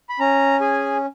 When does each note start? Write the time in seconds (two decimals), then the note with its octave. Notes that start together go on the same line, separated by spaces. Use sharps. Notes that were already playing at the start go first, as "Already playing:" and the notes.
0.09 B5
0.20 C#4 A#5
0.61 G#4 G#5